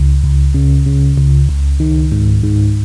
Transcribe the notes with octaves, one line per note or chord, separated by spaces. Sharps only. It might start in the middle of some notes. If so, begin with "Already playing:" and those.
Already playing: C#2
C#2
C#3
C#3
C#2
C#2
D#3
G#2
G#2